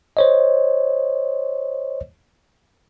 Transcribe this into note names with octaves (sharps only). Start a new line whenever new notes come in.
C5 C#5 D#5